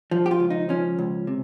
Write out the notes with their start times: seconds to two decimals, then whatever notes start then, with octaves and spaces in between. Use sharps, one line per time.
0.11 F3
0.26 G4
0.31 F4
0.40 C#2
0.50 D#4
0.69 F3 C#4
0.99 C#2
1.27 C3